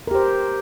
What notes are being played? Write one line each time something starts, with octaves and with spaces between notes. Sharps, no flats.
G4 A#4 C5